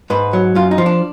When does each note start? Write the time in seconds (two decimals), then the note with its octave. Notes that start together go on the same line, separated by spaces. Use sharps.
0.10 G#2 B4
0.33 F#3
0.55 F#2 F4
0.71 D#4
0.78 F3
0.86 D4